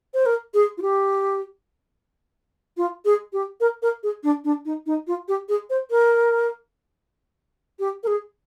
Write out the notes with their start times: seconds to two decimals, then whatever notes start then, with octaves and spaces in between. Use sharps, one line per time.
0.14 C5
0.26 A#4
0.54 G#4
0.78 F4
0.82 G4
2.77 F4
3.05 G#4
3.33 G4
3.60 A#4
3.82 A#4
4.03 G#4
4.24 D4
4.44 D4
4.65 D#4
4.86 D#4
5.07 F4
5.28 G4
5.49 G#4
5.70 C5
5.91 A#4
7.79 G4
8.03 A#4
8.07 G#4